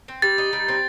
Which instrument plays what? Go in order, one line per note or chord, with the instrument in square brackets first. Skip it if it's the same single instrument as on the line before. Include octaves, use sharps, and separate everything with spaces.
[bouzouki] C4
[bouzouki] G3 [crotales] A6
[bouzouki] D#4
G3
C4